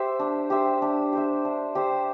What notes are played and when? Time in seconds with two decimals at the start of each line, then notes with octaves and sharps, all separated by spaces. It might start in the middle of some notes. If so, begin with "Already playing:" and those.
Already playing: G4 C5 E5
0.19 D4
0.50 G4 C5 E5
0.82 D4
1.13 G4 C5 E5
1.45 D4
1.75 G4 C5 E5